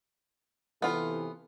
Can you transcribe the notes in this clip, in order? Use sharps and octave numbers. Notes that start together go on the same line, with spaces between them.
C3 E3 B3 F4 A4